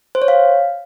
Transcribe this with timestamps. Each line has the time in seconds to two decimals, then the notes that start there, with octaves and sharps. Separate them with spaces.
0.15 C5
0.22 C#5
0.28 F5